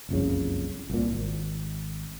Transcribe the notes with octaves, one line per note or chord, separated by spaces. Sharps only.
F#1 C2 F2 C#3
C2 A#2
G#1